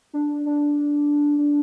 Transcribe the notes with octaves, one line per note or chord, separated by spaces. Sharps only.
D4
D4
D4